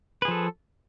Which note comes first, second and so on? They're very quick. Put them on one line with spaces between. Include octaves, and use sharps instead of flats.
B4 G#4 F3 A4